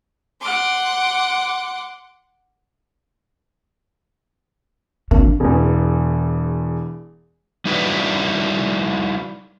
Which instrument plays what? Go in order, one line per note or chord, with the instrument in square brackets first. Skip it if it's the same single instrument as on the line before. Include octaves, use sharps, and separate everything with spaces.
[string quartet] F#5 C6 D6
[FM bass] G#1 [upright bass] D3 A#3
[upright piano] E1 E2
[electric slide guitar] G3 D#4 E4 F#4 B4 D5